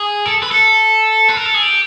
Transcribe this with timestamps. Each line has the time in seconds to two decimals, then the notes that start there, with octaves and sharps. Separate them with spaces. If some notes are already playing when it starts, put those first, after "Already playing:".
Already playing: G#4
0.26 A4
0.43 B4
0.51 A4
1.29 B4
1.37 A#4
1.45 A4
1.54 G#4
1.63 G4